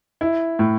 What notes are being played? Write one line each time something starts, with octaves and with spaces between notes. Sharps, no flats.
E4
A2